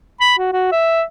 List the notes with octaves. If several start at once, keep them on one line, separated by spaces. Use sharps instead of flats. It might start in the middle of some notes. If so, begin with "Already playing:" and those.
B5
F#4
F#4
E5